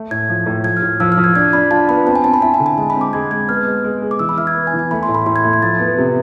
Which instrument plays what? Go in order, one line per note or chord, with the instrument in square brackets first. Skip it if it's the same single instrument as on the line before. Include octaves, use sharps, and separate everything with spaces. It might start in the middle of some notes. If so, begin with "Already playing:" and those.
Already playing: [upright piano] A3
[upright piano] A2 [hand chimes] G#6
[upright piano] F3
A2
[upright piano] F3 [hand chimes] G#6
[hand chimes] F6
[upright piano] A2
[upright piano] F3 [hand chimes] E6
[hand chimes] F6
[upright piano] F3
[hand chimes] G#6
[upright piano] D4 [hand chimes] G#6
[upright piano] D4 [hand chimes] B5
[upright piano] F4 [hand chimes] A5
[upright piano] B3 [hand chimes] B5
[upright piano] C4 [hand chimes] A5
[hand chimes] G#5
[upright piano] C4 [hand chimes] A5
[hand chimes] B5
[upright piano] E4 [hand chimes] A5
[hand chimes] G#5
[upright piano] D3
[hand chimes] G#5
[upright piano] G#3 [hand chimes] A5
[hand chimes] B5
[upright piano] C4
[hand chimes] D6
[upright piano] G#3 [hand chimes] G#6
[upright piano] G#3 [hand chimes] G#6
[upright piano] B3 [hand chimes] F6
[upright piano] G#3
G#3
G#4
[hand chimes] D6
[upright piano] E3 [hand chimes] E6
[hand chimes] B5
[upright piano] E4 [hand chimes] F6
[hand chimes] G#6
[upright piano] B3
[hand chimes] G#5
[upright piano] E3
[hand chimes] G#5
[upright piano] A3 [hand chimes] B5
[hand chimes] C6
[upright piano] A2
[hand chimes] B5
[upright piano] A2 [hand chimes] C6
[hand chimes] G#6
[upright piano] A3
[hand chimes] G#6
[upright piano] F3 [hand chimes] A6
[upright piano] B3
C3